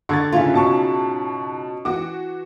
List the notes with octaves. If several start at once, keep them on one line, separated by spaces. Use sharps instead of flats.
D3 C#6 G#6 A6
G#2 C#3 C#4 E4 F4
B2 A5 C#6
E3 F#4 D6